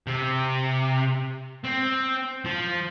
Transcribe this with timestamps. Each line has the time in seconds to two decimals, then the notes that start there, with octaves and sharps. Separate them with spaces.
0.07 C3
1.65 C4
2.45 F3